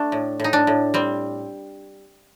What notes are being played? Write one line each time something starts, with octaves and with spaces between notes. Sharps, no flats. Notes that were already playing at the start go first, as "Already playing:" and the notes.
Already playing: A3 D4
A2
A2 D#4
D4
A2
G3 C4